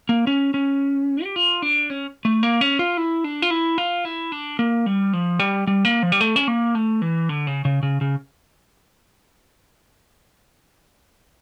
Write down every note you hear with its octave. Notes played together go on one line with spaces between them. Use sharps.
A#3
C#4
C#4
G4
F4
D4
C#4
A3
A#3
C#4
F4
E4
D4
F4
E4
F4
E4
D4
A#3
G3
F3
G3
G3
A#3
F3
G3
A3
C#4
A#3
A3
E3
D3
C#3
C#3
C#3
C#3